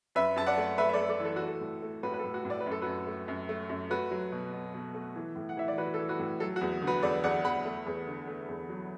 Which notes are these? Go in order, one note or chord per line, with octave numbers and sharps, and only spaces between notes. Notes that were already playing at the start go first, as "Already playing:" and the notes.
F#2 B4 E5
F#2 A5
D5 F#5
A3
A3 B4 E5
E5
A4 D5
A3
A4 D5
E3
A4
A3 F#4
A4
A2
A3
A2 F#4 B4
B4
A4
A2
F#4
A2
D5
B4
F#2
A4
F#2 F#4 B4
A3
F#2
A3
F#2
A3 F#4 B4
F#3
B2
B2
B2
A3
E3
A2
F#5
E3 E5
D5
E3 F#4 B4
A4
E3
F#4 B4
A2
F#3 A4
F#4
E2
D3
F#4 B4
E2 A4 D5
E2 D5 F#5
E2 F#5 B5
A3
E2
D3
A3
E2
F#3